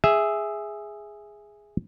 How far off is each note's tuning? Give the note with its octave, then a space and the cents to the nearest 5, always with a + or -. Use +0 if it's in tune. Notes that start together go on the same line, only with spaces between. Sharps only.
G#4 -5 E5 +0